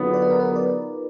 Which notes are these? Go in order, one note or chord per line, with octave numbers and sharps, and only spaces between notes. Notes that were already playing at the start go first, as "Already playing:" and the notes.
Already playing: D3 F#3 B3 D#4 F4 G#4
D5
B4
A#4
B4
D5